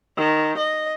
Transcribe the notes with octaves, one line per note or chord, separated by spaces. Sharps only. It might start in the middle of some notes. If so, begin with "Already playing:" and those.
D#3
D#5